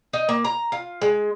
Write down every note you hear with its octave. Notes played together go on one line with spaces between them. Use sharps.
D#4
A#3
A#5
F4
G#3